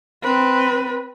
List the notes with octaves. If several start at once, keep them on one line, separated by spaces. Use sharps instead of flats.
C4 B4